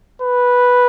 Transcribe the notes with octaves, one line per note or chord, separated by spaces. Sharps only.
B4